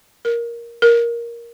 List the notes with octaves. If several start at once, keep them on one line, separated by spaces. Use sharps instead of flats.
A#4
A#4